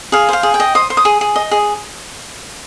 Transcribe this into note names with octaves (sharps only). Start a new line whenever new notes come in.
G#4 F5
C5 F5
G#4
G5
D#5
C5 D#6
C5
D#6
G#4
G#4
D#5
G#4